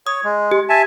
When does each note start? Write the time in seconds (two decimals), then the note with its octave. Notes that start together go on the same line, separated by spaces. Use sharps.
0.07 C#5 D#6
0.24 G#3
0.51 G4
0.69 E5 G#5 A5